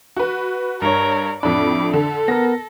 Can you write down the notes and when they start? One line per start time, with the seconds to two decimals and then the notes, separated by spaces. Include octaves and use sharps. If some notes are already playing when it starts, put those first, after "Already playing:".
0.17 F#4 B4
0.82 G2 A#4 C#5
1.43 F2 A2 D4 B5 D6
1.93 D3 A4
2.28 B3 A#4 A#6